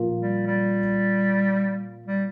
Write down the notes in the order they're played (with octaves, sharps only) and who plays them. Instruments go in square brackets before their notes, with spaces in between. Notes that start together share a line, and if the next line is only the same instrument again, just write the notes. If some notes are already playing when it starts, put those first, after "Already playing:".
Already playing: [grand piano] A#2 F3 A#3 F4
[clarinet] G3
G3
G3